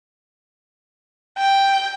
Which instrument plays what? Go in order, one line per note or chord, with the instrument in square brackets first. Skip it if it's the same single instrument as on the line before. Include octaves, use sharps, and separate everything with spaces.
[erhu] G5